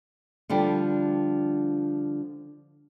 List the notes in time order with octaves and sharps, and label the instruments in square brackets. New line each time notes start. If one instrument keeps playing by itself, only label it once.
[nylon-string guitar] D3 F3 G3 D4